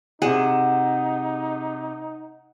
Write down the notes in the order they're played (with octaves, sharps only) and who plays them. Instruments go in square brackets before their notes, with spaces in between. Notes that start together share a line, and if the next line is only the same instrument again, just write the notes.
[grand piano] C3 E7 [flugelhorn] D#4 [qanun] G#4 [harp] F#5